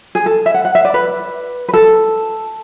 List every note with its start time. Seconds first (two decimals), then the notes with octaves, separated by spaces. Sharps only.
0.15 G#4
0.26 A4
0.46 E5
0.54 F#5
0.65 F#5
0.75 E5
0.85 D5
0.94 B4
1.68 B4
1.73 A4